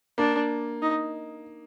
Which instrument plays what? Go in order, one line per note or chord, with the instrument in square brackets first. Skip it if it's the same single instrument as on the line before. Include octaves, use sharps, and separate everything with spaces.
[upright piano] A#3 [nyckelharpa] D4
[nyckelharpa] D#4